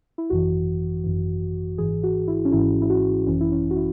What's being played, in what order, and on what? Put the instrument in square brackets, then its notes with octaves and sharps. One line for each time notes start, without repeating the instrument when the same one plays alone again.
[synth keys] E4
G#1 F#2 E3 F#4
G#1 F#2 E3
G#1 G#2 E3 G#4
F#4
E4
C#4
G#1 G#2 E3 E4
E4
F#4
G#1 F#2 E3 C#4
E4
C#4
F#4
E4